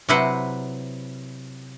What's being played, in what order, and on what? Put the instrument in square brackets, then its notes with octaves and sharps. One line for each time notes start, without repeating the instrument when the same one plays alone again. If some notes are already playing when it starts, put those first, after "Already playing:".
[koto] C3 F#3 E4 B4 C5 F#5